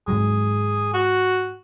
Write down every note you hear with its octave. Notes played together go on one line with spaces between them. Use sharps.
G#2 D#3 F#3 G#4
F#4